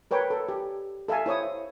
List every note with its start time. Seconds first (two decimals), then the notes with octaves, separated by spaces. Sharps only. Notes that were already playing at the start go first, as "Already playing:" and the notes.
0.11 A#4 B4 C#5 G5
0.30 A4
0.49 G4
1.08 A4 E5 F5 G#5
1.26 E4 C5 C#5 D#6